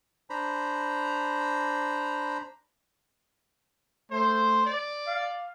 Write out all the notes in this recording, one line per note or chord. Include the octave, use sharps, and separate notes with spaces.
D4 C5 A#5 B5
A3 C5
D5
F5